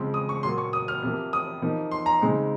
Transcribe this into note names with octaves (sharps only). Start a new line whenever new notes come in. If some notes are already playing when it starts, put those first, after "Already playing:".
Already playing: C#3 F3 G#3 C4
D#6
C#6
A#2 F#3 A#3 C6
C#6
D#6
F6
C3 F3 A#3
D#6
C3 F3 A#3 D#4
C6
A#5
C#3 G#3 C4 D#4